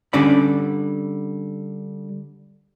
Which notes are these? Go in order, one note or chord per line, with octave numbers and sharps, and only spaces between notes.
D3 G3 C#4 D4 D5 B5